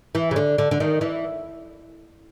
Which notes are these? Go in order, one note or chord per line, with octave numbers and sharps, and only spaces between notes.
E3
C#3
D3
D3
D3
D#3
E3